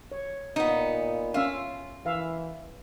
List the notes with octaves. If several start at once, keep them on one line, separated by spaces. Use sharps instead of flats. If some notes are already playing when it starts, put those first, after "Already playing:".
C#5
A#2 B3 D#4
C#4 F4 E5 F5
E3 E5 F5